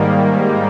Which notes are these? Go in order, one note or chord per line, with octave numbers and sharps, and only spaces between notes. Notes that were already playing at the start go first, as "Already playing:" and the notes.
Already playing: G#2 D#3 G3 A#3